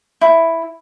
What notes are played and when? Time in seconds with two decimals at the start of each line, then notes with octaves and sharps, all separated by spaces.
0.21 E4